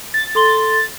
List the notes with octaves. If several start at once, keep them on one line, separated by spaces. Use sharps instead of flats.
A6
A4 C6 G7